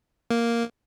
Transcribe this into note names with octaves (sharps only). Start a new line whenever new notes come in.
A#3